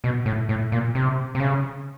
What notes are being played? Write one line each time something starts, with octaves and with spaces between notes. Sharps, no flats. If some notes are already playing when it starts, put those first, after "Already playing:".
B2
A2
A2
A#2
C3
C3
C#3